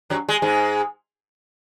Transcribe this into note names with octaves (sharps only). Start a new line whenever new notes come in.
F#2 F#3
G#3
G#2 G#3